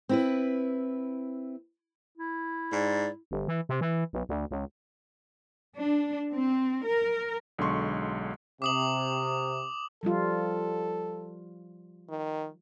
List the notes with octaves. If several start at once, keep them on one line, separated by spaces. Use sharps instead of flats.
C4 E4 B4
E4
G#2 D5
G1
E3
C3
E3
B1
D2
C#2
D4
C4
A#4
B1 D3 G#3 C6 C#6
C3 D6 D#6 F#7
F3 G3 F4 A4
D#3